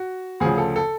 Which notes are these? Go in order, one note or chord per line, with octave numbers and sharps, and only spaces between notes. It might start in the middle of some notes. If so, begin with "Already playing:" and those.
Already playing: F#4
D2 C#3 F3 G#4
A4
A4